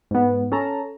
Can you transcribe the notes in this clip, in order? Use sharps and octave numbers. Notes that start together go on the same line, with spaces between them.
G#2 B3
C#4 A4 A5 A#5